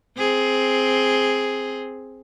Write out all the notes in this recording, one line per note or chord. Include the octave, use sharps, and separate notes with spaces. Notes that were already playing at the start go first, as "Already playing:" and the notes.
C4 G#4